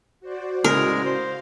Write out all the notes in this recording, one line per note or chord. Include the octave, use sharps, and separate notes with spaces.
F#4 C5 D5
C#2 A2 C#3 G#3 A#4
C5 F5